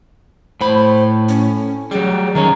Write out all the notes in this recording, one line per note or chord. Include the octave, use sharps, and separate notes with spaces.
A2 C5 B5
C#4
F#3 G3 G#4
D#3 C#4 A#5